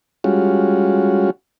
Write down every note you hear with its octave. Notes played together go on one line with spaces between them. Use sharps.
G3 G#3 C#4 F4 F#4